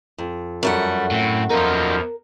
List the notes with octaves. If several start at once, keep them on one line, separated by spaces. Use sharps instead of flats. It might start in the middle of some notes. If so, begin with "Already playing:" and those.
F2
F#2 G3 A3 F#5
A2 C4
E2 F3 D#4 F4 A#4